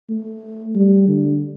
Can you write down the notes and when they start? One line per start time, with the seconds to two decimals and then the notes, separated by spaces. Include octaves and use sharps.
0.10 A3
0.75 G3
1.08 D3